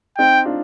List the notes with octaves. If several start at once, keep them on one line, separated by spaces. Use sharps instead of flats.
C4 D#4 G5
D4 F4